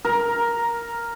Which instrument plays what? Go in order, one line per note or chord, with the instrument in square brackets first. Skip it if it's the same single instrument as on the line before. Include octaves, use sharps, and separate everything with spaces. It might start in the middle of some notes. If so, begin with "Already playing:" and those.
[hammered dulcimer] A#4